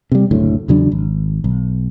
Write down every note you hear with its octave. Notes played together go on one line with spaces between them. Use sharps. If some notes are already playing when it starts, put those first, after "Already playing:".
C3 G3
F#1 D2 A2
E2 C#3 F#3 D4
G#1
B1